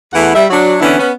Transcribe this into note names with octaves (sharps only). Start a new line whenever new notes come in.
E2 E3 A3 E4 F#5
G3 E5
F#3 D4 F#4
D3 E3 B3 C#4 D4 E4
B3 C#4